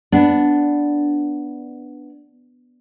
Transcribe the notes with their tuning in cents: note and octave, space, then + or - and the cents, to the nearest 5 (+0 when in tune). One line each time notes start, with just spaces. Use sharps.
B3 +0 D4 -5